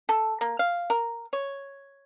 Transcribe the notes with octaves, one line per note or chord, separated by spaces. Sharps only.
A4
A#3
F5
A#4
C#5